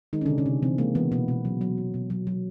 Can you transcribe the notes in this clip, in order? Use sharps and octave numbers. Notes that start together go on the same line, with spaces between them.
D#3 G#3 D#4
C#4
D3 D4
C3
C#3 C#4
C3
C3 E3 C4
G#3 A#3
E3 B3
B2 B3
B2
F#3
F#3
B2
B2
F#3
F#3